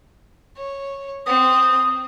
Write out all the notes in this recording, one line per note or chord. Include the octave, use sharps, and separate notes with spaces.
C#5
C4 D#6